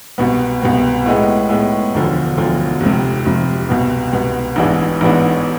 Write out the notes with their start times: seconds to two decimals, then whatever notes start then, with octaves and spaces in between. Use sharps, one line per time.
0.18 C2 B2 B3
0.62 C2 B2 B3
1.06 A2 G#3 B3
1.49 A2 G#3 B3
1.94 E1 D2 D3 F3
2.37 E1 D2 D3 F3
2.81 F1 F2 C3
3.25 F1 F2 C3
3.69 C2 B2 B3
4.13 C2 B2 B3
4.56 A1 G#2 E3 B3 D4
5.01 A1 G#2 E3 B3 D4